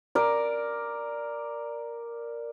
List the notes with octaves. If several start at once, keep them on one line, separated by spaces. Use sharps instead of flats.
A#4 D5